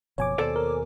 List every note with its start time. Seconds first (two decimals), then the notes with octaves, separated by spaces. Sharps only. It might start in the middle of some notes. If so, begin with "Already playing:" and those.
0.18 F#1 B2 F3 C#5 G#5 D6
0.38 D#2 B2 A4 C5 D5
0.56 A#4